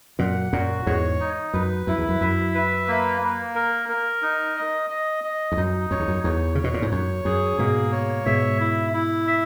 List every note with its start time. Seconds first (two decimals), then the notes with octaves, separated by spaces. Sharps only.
0.19 F#2 A#2 F#5
0.53 F#2 A#2 F#4
0.86 E2 G#2 C#5
1.20 D#4
1.53 F#2 B4
1.87 F#2 E4
1.98 E2
2.09 F#2
2.21 F#2 E5
2.55 B4
2.88 A#3
3.22 A#3
3.55 A#4
3.89 A#4
4.22 D#4
4.56 D#5
4.90 D#5
5.24 D#5
5.52 E2
5.57 F#2 D#4
5.91 F#2 C#5
6.00 E2
6.08 F#2
6.24 E2 C#5
6.55 C#3 C#5
6.64 B2
6.74 A#2
6.82 G#2
6.91 F#2 C#5
7.25 F#2 G#4
7.58 G#2 B2 A#3
7.92 C#5
8.26 G#2 B2 E5
8.60 E4
8.93 E4
9.27 E5